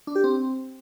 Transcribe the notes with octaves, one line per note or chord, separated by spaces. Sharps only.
D4
G4
C4